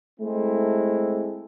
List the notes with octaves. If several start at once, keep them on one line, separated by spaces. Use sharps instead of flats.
G#3 A3 C4 E4